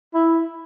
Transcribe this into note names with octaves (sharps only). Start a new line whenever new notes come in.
E4